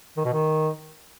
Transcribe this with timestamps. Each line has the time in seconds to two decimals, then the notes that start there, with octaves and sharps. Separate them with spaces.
0.17 D#3
0.25 B2
0.33 D#3